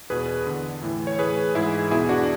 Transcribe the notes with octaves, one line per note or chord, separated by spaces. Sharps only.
E2 B2 G#4 B4
E2 D3
A2 E3
C#5
A2 E3 G#4 B4
G#2 E3 E4 G#4
E2 B2 E4 G#4
D4 F#4